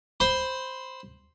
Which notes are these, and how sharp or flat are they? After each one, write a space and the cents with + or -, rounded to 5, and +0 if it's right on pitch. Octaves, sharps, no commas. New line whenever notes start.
C5 +0 B5 +0